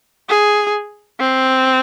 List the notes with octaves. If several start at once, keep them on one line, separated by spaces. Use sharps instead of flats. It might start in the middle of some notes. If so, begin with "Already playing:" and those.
G#4
C4